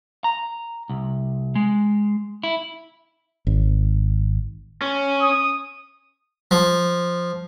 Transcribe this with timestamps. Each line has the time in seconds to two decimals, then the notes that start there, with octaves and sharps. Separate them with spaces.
0.24 A#5
0.89 C2
1.55 G#3
2.43 E4
3.47 G#1
4.81 C#4
5.22 D#6
6.51 F3